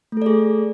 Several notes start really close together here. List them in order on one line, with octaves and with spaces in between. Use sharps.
A3 A4 D5 G#4